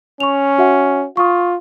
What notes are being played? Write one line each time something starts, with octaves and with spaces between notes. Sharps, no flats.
C#4 C#6 F7
F#4 E5 F#5
F4 C#6 D#6